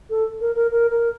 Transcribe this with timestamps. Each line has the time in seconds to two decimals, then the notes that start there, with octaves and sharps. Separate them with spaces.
0.10 A4
0.40 A#4
0.55 A#4
0.71 A#4
0.91 A#4